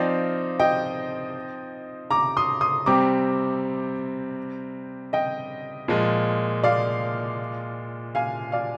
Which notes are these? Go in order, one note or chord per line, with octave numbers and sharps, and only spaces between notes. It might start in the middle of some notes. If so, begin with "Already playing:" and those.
Already playing: F3 C4 D#4 D5 F5
D#5 G5
A#5 D6
C6 D#6
C6 D#6
C3 G3 C4 A#5 D6
D#5 G5
A#2 F3 G#3
D5 F5
F5 G#5
D5 F5